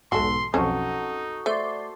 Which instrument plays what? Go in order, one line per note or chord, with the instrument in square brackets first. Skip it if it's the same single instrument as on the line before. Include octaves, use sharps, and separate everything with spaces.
[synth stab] B1 E2 G#2 [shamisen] F#4 A4 [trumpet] C6
[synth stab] B1 F2 [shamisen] C#4 C5 [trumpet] D#4 [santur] F#4 A4
[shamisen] A3 [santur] C5 [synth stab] D5 C6